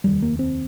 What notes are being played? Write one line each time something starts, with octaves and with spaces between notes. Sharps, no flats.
F1 D#2 G3
A#3
C4